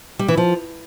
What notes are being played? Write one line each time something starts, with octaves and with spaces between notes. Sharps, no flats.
G3
E3
F3